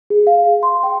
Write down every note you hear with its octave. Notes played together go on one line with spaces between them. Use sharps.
G#4
F5
C6
G5